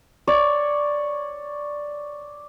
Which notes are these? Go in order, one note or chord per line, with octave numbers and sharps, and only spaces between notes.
C#5 D5